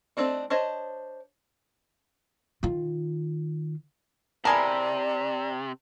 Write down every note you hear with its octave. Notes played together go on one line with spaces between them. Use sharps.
A3 C4 D4 D#4
D4 C5 C#5 D#5
D#3 F4
C3 E4 G#4 A#4 D5 A5